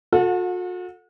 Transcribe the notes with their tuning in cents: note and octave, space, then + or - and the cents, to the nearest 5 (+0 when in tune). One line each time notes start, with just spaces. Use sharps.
F#4 -45 A4 +0 F#5 -30